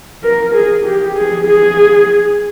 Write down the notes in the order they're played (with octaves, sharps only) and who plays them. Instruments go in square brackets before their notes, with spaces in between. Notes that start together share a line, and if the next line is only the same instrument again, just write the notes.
[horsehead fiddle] A#4
G#4
G4
G#4
G#4